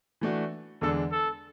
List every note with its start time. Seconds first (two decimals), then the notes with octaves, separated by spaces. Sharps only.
0.21 E3 A3 D4 F#4
0.81 E2 D3 G#3 D4 A4
1.11 A4